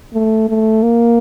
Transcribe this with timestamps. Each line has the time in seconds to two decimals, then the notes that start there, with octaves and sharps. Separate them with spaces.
0.14 A3
0.49 A3
0.83 A#3